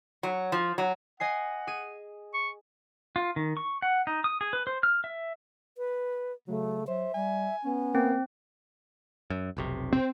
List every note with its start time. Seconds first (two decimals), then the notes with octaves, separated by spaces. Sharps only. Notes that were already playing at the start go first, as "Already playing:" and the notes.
0.23 F#3
0.52 F3
0.78 F#3
1.20 D#5 F#5 G#5 C7
1.67 G#4 D#7
2.34 C#6
3.16 F4
3.36 D#3
3.57 C#6
3.82 F#5
4.07 D#4
4.24 D#6
4.41 G#4
4.53 B4
4.67 C5
4.83 F6
5.04 E5
5.78 B4
6.48 C#3 F#3 A3
6.88 F#3 C5 E5
7.14 G3 G#5
7.64 B3 C#4
7.95 A#3 C4
9.30 F#2
9.57 F1 B1 C3
9.93 C4